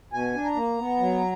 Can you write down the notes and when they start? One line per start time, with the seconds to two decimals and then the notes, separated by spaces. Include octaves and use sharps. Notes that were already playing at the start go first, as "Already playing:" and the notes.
0.13 B2 G#5
0.35 D4
0.45 A#5
0.56 A#3
0.78 B3
1.00 F#3